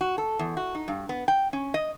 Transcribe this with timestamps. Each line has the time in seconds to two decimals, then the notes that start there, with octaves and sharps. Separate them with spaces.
0.01 F#4
0.18 A4
0.39 E2
0.57 F#4
0.75 D#4
0.88 G2
1.09 B3
1.28 G5
1.53 C#4
1.74 D#5